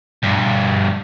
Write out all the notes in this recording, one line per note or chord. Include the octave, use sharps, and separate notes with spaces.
D2 G2